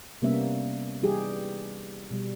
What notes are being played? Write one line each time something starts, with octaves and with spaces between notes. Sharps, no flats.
C3 G3 A#3 B3 C#4 E5
E3 G3 D#4 G4 G#4
B2 G3